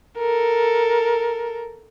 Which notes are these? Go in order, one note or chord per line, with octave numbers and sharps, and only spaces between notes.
A4 A#4